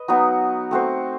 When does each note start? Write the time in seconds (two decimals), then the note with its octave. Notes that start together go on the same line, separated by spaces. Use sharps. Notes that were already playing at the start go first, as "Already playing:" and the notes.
Already playing: B4 D#5
0.08 F#3 B3 D#4 F#4
0.71 A3 C4 F#4 C5